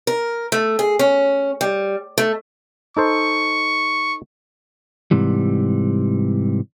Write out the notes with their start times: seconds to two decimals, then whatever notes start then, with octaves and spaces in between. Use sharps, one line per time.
0.07 A#4
0.52 A3
0.79 G#4
0.99 C#4
1.61 G3
2.18 A3
2.97 D#4 A4 C5 C#6
5.11 G#2 C3 E3 G3